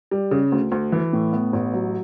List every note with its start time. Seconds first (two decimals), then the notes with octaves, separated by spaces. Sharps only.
0.11 G3
0.31 C#3
0.52 D2
0.72 D2
0.92 E3
1.13 A2
1.33 B3
1.53 A1
1.73 F#3